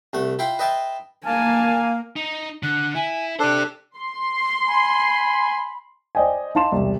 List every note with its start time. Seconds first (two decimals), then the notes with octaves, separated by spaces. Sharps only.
0.13 C2 A3 F#5
0.39 E4 F4 G5 B5 C6
0.59 B4 D#5 E5 G5 A5 C6
1.26 A#3 F5 G#5 A5
2.16 D#4
2.63 D3 F#6
2.95 E4 G#5
3.39 D4 G4 A4 C5 F#6
3.97 C6
4.67 G#5 B5
6.15 C5 D5 D#5 G5 G#5
6.55 D#4 F5 A5 C6 E7
6.72 E1 C2